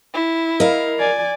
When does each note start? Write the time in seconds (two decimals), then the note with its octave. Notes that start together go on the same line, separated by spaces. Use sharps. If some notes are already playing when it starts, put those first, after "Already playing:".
0.14 E4
0.60 A#4 D#5 F5
0.99 D5 G#5